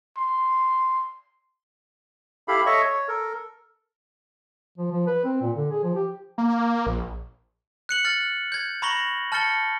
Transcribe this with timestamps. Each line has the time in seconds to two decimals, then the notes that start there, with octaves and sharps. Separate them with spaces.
0.17 C6
2.48 E4 G4 A4 F5 B5
2.66 A4 C#5 D#5 E5 C#6
2.83 C#5
3.08 A4 A#4
4.78 F3
4.91 F3
5.07 B4
5.24 C4
5.41 A#2
5.57 D3
5.71 G#4
5.83 F3
5.95 G4
6.38 A#3
6.86 A#1
7.89 F#6 C#7 F#7
8.05 F6 F#6 A6
8.52 G6 G#6
8.82 A#5 B5 C#6 A#6 F#7 G7
9.32 A5 F6 G6 A6 C#7 G7